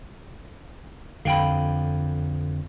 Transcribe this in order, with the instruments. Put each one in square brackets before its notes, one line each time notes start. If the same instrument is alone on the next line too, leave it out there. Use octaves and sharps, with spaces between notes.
[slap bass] F2 D3 [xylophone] F5 G5 B5